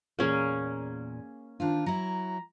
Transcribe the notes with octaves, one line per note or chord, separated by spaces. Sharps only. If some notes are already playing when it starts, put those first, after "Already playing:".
E2 A#2 A#3 C#4 G#4
D#3 C4 D4 F4
F#3 E4 A#5